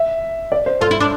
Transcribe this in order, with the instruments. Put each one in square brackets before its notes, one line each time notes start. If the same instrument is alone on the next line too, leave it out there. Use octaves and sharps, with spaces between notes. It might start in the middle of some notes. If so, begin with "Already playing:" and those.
Already playing: [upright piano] E5
D5
C5
[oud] F4 [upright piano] A4
[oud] E4
D4